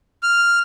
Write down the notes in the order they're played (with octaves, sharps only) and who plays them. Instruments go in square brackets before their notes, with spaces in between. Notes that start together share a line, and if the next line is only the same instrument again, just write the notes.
[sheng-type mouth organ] F6